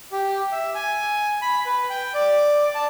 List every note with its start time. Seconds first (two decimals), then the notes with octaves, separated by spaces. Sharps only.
0.12 G4
0.52 E5
0.75 G#5
1.42 B5
1.66 B4
1.90 G5
2.14 D5
2.75 A5